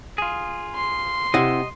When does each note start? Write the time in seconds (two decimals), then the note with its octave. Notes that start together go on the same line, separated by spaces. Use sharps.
0.18 F4 G#4
0.75 C6
1.34 C3 E4 D#5 F#5